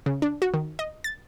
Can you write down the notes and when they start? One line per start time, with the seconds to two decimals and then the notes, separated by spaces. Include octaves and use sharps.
0.06 C#3
0.22 D4
0.42 F#4
0.54 D#3
0.79 D#5
1.04 A6